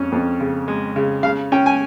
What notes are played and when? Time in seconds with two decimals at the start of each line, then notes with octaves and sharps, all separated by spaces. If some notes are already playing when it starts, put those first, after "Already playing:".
Already playing: F2 C#4
0.12 F2
0.40 C#3
0.68 G#3
0.96 C#3
1.23 C#3 F5
1.52 C#4 G5
1.66 G#5